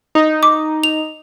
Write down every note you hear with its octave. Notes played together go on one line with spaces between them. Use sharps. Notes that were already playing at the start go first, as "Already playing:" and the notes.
D#4
D6
F7